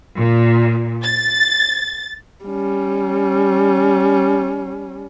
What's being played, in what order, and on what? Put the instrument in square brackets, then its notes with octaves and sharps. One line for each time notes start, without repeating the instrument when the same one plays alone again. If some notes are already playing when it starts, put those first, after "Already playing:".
[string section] A#2
A6
[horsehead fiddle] G3 C#4